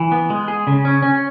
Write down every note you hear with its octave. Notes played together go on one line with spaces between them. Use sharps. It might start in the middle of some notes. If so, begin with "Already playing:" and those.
Already playing: E3
B3
G#3
G#4
C#3
C#4
C#4